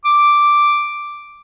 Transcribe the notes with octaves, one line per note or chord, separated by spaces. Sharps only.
D6